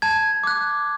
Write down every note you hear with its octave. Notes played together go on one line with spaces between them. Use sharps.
A5 G#6
D6 F#6